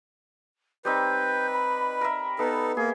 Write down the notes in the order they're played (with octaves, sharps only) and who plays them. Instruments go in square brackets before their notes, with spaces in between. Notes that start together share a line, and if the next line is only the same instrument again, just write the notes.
[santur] G3 C4 D#4 [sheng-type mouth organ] B4 [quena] G6
[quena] B5
[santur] A#4 E5
[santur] B3 [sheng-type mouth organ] D#4 A4
[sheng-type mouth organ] A#3 [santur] G#4